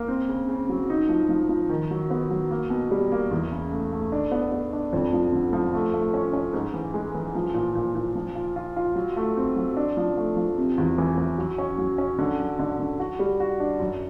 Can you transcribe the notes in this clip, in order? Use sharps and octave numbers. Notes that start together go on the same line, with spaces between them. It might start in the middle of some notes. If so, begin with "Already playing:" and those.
Already playing: A#3
C4
C#3
C#3
F#3
D#4
F3
F3
F3
D#3
F#3
B3
F#3
A#3
B2
G3
A#3
E2
C#3
A3
A3
D4
B3
B3
D4
F2
F3
D3
F3
A3
A3
C#4
C#4
G#2
E3
G#3
E3
F3
A#2
A#2
A#2
F3
F4
F4
F4
F#3
A3
C4
F#3
D4
F3
A3
F3
C3
E2
E3
E3
F#3
C#4
F#3
C#4
D3
F#3
D3
D3
F#4
G3
F#4
D4
F#2